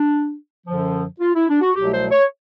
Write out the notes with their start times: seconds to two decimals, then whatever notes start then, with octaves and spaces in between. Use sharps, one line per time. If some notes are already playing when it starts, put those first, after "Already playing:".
Already playing: D4
0.67 F#2 D3 F3
1.20 F4
1.35 E4
1.48 D4
1.61 F#4
1.75 C2 B2 F#3 A3 G4
1.92 C5
2.11 C#5